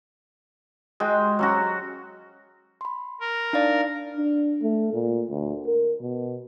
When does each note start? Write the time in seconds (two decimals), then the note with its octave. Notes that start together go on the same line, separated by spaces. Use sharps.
1.00 G#3 F#4 G5
1.39 F#3 C#4 F#4
2.81 B5 C6
3.21 A#4
3.53 D4 D#4 D5 F5 A#5
4.16 D4
4.63 A3
4.93 A#2
5.30 D2
5.67 A#4
6.01 B2